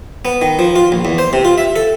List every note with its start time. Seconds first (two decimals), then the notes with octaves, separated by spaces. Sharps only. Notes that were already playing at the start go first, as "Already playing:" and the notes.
0.25 B3
0.42 D#3
0.59 F3
0.76 F4
0.92 A#1
1.05 E2
1.18 C5
1.33 C3
1.45 F4
1.58 E5
1.76 A4